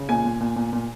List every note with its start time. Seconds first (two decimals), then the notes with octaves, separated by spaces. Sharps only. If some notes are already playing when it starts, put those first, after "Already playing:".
Already playing: C#3
0.09 A#2 G#5
0.25 A#2
0.41 A#2
0.56 A#2
0.73 A#2